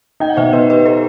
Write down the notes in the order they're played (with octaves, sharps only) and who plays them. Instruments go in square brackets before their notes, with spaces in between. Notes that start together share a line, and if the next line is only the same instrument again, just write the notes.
[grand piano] D#4 [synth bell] G5
[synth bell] F#5
[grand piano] B2 [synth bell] C5 E5
[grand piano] D#4 [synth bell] B4 D#5
[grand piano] G4 [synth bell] B4 D#5
[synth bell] A4 C5